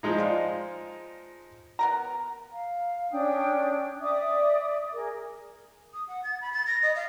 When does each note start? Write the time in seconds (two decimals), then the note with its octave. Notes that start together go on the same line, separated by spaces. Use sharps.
0.03 F3 G#3 D#4
0.18 D5 F5
1.79 B3 A#4 A#5
2.51 F5
3.11 C#4 D4 G5 D#6
4.01 D5 E5 D6 D#6
4.93 G#4 A#4
5.93 D#6
6.08 F#5
6.24 A6
6.41 B5
6.53 A6
6.67 A#6
6.83 D#5
6.96 F5